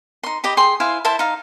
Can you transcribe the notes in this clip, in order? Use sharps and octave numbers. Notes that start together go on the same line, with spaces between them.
D#4 C6
G4 D#5 B5
G#4 G5 C6
E4 C5 F5 G#5
E4 C5 E5 A5
D#4 F5